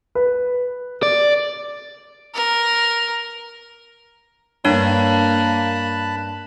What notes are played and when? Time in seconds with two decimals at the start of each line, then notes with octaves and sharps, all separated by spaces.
0.15 B4
1.03 D5
2.34 A#4
4.65 G2 A#3 D4 C#5 A5 B5 F#6